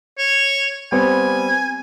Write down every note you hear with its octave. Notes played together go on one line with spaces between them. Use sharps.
C#5
G3 B3 C4 G#5